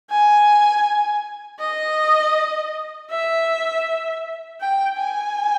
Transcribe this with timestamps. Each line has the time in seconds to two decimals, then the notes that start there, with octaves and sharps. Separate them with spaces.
0.11 G#5
1.61 D#5
3.11 E5
4.61 G5
4.98 G#5